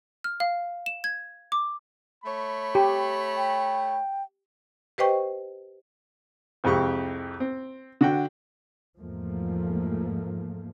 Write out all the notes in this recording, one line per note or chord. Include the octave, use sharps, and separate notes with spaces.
F6
F5
E7
G#6
D6
A3 C#5 B5
G4
G5
G4 B4 C5 D#5 G5 C#6
C2 F2 G#3 G4 C#6
C4
D3 F#4 G5
E2 G#2 F3 A3 A#3